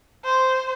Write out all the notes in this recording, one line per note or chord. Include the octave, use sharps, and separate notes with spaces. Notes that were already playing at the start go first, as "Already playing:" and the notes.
C5